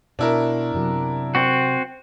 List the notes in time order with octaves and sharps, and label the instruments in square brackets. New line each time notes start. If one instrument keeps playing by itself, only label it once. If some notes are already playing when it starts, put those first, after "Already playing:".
[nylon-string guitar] B2 [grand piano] D4 E4 A#4
[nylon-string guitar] F#2 C3 F#3
[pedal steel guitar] C4 F#4